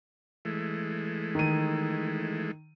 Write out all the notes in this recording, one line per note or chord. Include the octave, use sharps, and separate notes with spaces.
E3 G#3 A3
D#3 D#7